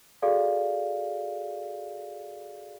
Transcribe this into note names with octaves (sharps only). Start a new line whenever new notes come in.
F#4 G#4 A4 D5 F5